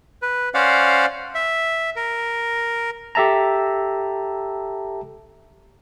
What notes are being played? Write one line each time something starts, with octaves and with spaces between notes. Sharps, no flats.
B4
C#4 C5 D5 F5 F#5
E5
A#4
G4 A4 E5 A5 A#5